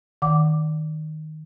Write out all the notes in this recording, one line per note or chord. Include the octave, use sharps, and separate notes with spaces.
D#3 F#5 D6